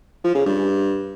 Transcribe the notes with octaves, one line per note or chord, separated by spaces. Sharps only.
F3
C#3
G2